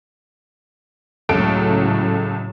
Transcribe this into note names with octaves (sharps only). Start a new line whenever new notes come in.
C#2 A2 C#3 F#3 A4 D7